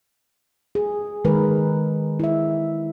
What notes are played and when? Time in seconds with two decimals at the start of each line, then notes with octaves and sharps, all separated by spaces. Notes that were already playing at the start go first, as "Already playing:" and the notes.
0.75 G#4
1.25 D#3 G#3 A#4 B4
2.19 E4 E5